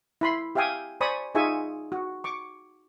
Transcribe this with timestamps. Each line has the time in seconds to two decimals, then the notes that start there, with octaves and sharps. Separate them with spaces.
0.21 E4 B5 C6
0.55 G4 E5 F5 G5 G#5 D#6
1.01 C5 D5 G#5 B5 C#6 D#6
1.35 D#4 F4 G#4 E5 G#5 C#6
1.92 F#4
2.24 C#6 D6